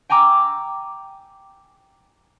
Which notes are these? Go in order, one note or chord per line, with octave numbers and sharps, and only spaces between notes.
G5 G#5 A#5 D6 E6